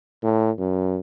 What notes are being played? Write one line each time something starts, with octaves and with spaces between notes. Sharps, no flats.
A2
F#2